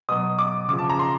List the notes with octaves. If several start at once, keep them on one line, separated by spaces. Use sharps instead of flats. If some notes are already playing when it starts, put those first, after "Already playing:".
B2 F#3 D#6
D6
C#3 F3 D6
A5
A#5
C6